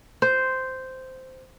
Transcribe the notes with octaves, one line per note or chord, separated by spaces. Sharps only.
C5